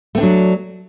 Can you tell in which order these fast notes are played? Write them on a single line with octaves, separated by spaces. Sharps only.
A3 C4 D4 F#3